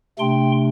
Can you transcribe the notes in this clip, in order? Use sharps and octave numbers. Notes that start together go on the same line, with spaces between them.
C3 A3 D4 G5 C6